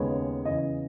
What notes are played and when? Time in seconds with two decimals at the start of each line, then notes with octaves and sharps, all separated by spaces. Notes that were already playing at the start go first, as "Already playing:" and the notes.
Already playing: D#2 C#3 G#3 B3 C#5
0.45 E2 C#3 E3 D#5